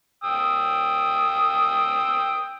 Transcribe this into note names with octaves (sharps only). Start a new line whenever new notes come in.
G5 D#6 E6